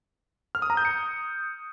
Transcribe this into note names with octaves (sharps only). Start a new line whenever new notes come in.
F6
D#6
A#5
G6
C#7